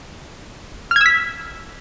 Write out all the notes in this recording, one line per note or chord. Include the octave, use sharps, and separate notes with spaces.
E6 F6 G#6 B6